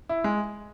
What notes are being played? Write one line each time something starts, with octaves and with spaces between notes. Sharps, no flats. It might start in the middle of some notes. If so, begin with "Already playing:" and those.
E4
G#3